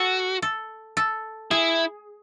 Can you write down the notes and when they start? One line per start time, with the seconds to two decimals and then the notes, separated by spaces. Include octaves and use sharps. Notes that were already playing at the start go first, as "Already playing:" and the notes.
Already playing: F#4 A4
0.42 A4
0.97 A4
1.51 E4 G#4